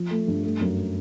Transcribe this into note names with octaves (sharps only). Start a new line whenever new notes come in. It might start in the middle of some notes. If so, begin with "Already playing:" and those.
Already playing: F3
A3
G2
A3
F#2